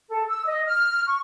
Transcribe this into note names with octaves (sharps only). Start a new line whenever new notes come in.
A4
E6
D#5
F6
C#6